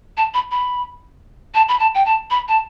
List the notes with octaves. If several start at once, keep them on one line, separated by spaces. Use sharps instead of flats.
A5
B5
B5
A5
B5
A5
G5
A5
B5
A5